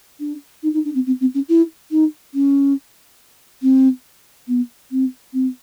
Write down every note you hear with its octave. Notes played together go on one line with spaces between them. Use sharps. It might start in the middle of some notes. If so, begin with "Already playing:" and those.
D4
D#4
D#4
D4
C4
C4
C4
C#4
E4
D#4
C#4
C4
B3
C4
C4